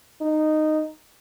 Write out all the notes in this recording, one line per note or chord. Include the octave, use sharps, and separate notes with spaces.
D#4